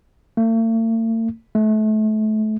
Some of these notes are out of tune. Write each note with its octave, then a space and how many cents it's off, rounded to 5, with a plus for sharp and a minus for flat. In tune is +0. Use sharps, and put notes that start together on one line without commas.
A3 +45
A3 -30